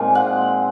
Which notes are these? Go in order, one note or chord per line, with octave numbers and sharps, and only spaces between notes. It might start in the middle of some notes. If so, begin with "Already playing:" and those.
Already playing: A#2 F3 G#3 C4 D#4
F#5